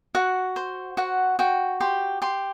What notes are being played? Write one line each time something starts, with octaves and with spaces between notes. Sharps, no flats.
F#4 F#5
C5
F#4 F#5
F#4 G5
G4 C6
G4 C6